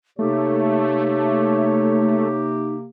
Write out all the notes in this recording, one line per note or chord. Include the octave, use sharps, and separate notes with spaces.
C3 A3 A#3 D#4 G4 C#5